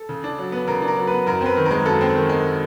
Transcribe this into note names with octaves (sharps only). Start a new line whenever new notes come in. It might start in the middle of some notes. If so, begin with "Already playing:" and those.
Already playing: A4
C#3
D4
F#3
B3
C#3 A#4
D4
A#4
F#3
B3 B4
F#2 A#4
C4 B4
D#3
A#4
G#3
F#2 A4
C4
D#3
G#3